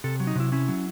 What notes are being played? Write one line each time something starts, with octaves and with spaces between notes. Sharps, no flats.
C3 A4
F#3
D#4
C3 E4
C#4 E4
F#3